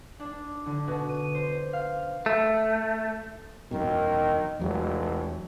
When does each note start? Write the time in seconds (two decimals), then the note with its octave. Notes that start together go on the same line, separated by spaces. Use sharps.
0.20 D4
0.66 D3
0.87 B2
1.09 D#7
1.35 C5
1.73 F5
2.26 A3
3.71 E1 F#2 B2 D#3
4.59 F1 E2 F#3 G#3